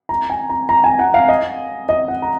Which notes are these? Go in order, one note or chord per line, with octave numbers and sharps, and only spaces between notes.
A#5
G#5
A#5
A#5
G#5
F#5
F5
D#5
D#5
F#5
A#5